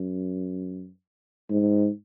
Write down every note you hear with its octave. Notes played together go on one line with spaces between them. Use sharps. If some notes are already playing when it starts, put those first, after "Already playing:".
Already playing: F#2
G#2